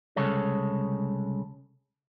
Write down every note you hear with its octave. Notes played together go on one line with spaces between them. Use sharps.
C2 C#3 G#3 A4 C#5